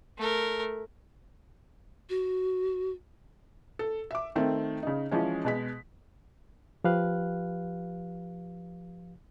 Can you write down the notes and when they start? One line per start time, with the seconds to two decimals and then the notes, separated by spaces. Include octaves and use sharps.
0.18 A3 A#4
2.10 F#4
3.79 A4
4.11 E5 D6
4.36 D#3 A3 C4
4.83 C#3 D#4
5.11 E3 F3 G#3 C#4
5.45 B2 G#3 B6
6.84 F3 G4 B4 F5 F#6